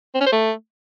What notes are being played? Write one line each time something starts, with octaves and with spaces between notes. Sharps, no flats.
C4
C#4
C5
A3